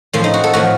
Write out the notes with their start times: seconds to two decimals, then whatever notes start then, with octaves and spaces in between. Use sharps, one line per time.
0.13 A2 F3 C4
0.24 D#4
0.34 F#4
0.44 A4
0.53 A2 F3 F#4